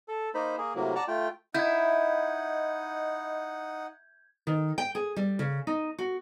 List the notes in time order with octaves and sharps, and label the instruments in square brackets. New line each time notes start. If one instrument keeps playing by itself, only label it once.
[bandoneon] A4
A#3 D#4 C5 B5
A#3 G#4
A2 C3 F#3 A#3
D5 F#5 A5 A#5
A3 F4 G5
[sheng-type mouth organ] D#4 F#5 [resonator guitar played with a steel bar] E4 [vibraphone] D#5 B5 [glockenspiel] G6 G#6
[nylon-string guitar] D#3
G5
G#4
G3
C#3
D#4
F#4